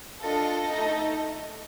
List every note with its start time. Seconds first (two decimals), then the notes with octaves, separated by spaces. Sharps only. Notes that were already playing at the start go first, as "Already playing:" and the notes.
0.23 D4 F4 A4 D#5
0.65 A3 D#4 A4